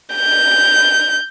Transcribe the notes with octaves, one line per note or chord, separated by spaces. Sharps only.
G6